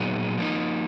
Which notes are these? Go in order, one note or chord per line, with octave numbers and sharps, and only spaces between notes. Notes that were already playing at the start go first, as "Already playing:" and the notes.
Already playing: A#2 F#3 B3 D#4 G#4
F3 A#3 D#4